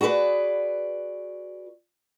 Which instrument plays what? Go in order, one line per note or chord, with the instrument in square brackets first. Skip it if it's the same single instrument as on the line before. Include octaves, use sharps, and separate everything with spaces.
[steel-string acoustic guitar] F#4 G#4 A#4 B4 D5